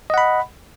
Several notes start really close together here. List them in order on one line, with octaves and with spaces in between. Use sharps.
D#5 F#5 B5